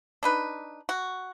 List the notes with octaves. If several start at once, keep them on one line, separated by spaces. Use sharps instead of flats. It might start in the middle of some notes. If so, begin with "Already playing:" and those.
D4 D#4 B4
F#4